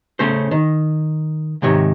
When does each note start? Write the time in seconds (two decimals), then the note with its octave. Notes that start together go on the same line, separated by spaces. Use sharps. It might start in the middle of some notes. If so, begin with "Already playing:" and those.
0.19 C#3 A3 C#4 C5
0.51 D#3
1.62 G#2 C3 D#3 C#5